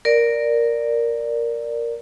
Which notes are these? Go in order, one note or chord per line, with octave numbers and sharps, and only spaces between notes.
A#4 D5